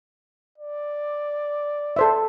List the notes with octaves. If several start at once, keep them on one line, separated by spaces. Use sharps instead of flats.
D5
A4 C5 E5